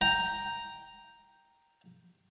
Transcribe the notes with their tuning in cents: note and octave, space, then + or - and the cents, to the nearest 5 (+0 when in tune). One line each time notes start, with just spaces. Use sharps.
G5 +0 A#5 +0